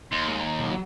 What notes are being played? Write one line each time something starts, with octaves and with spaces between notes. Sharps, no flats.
D#2 C6
G#3
A#5
B1
F#3